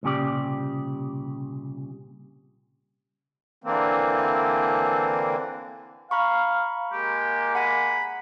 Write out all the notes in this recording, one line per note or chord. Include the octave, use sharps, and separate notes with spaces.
C2 A#2 C#3 G4 D5
D3 E3 A#3 C4
F5 A#5 B5 C#6
G#3 A#3 G4
F#5 G#5 B5